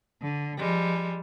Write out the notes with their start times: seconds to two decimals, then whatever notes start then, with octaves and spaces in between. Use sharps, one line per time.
0.22 D3
0.58 F3 G3 G#3